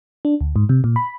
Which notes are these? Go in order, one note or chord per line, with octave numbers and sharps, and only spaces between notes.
D4
D2
G#2
C3
A#2
B5